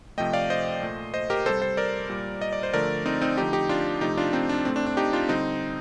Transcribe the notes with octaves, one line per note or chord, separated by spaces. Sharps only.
C3 F3 A3 D#5 G5
D5 F5
C5 D#5
A#2 A3
C5 D#5
G4 A#4
C3 G3 A4 C5
A4 C5
A#4 D5
A#2 G3
D#5
D5
C5
D3 F3 A3 A#4 D5
C4 D#4
C4 D#4
D3 F3 A3 D#4 G4
D#4 G4
D4 F4
C3 F3 A3 D#4 G4
D4 F4
C4 D#4
D4
A2 A3 C4
D4
D4
D#4 G4
D4 F4
D3 G3 C4 D#4